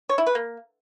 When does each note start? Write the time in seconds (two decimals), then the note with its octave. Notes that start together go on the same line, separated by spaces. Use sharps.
0.09 C#5
0.18 E4
0.27 B4
0.35 A#3